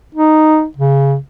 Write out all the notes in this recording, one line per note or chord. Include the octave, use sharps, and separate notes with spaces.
D#4
C#3